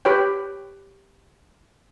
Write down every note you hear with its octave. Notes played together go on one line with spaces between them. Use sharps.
G4 B4 C#5 G5